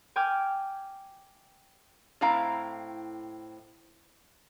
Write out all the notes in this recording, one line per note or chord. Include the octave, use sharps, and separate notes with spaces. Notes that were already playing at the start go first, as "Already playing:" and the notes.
G5 G#5 D6 F6
A2 C4 E4 F5 A#5